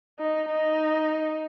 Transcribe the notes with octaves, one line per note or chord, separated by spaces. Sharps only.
D#4
D#4